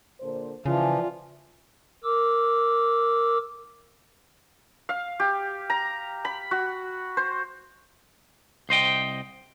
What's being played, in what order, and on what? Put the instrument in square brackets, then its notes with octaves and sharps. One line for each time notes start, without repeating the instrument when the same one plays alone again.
[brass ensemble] A#2 D3 C5
[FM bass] C#3 [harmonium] E3 F3 [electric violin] F4 [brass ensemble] D5 E5 G#5
[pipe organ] A#4 D6 E6
[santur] F5
G4
A#5
B5
F#4
C5
[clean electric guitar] C2 C5 D#5 G5